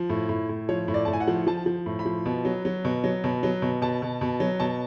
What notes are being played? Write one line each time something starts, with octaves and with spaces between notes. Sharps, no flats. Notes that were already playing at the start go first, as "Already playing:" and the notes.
Already playing: F3
A2
A2
A2
F3 C#5
A2
D5
A2 A5
G#5
F#5
F3
F3 A5
F3
A2
B5
F3
B2
F#3
F#3
B2
F#3
B2
F#3
B2
B2 A5
B2
B2
F#3
B2 A5